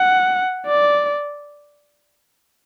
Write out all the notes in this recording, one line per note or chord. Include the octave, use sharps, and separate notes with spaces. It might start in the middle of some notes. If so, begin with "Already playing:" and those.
Already playing: F#5
D5